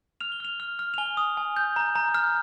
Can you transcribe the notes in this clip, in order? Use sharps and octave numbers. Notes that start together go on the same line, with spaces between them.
F6 F7
G7
F6 F7
F6
F6
F7
G#5 G7
D#6
G#5
G6
A#5
A#5
F6